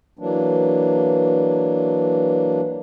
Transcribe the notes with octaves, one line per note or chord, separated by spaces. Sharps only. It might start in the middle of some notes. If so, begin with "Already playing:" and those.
E3 F#3 A#3 D4